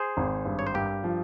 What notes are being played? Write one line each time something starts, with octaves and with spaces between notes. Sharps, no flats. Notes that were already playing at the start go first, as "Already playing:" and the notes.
Already playing: G#4 C5
G#1
G2
C#5
C5
G2 G4 A#4
F3